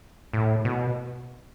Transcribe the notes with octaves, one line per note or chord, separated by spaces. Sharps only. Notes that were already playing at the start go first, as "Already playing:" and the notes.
A2
B2